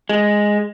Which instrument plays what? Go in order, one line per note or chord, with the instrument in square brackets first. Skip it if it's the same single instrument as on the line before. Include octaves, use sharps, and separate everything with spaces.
[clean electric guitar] G#3